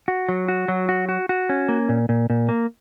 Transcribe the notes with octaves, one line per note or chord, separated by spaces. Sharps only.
F#4
F#3
F#4
F#3
F#4
F#4
F#4
C#4
A#3
A#2
A#2
A#2
A#3